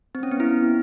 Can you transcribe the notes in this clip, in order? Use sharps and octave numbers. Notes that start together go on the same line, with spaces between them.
C4
C#4
B3
E4